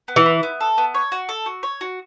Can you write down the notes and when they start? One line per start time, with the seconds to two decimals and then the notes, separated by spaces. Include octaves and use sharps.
0.08 B3
0.16 E3
0.26 E4
0.43 B3
0.60 A4
0.78 B3
0.94 C#5
1.12 F#4
1.29 A4
1.46 F#4
1.63 C#5
1.81 F#4